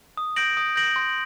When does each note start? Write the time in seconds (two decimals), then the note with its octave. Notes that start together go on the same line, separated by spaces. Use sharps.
0.17 D#6
0.36 G6 A#6 D7 F#7
0.57 D#6
0.76 G6 A#6 D7 F#7
0.96 C6